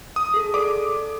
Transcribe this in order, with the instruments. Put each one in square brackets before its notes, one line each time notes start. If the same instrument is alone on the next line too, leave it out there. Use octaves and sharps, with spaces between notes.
[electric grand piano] D#6
[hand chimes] G#4 A4
[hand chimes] A4 D5 [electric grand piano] D6